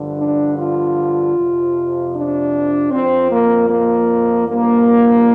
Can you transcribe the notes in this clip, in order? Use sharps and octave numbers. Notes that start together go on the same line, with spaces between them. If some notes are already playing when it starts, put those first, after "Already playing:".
Already playing: G2 D3 F3
D4
F4
F2 C3 F3
D4
F2 F3 C4
A#3
A#3
G2 F3 A#3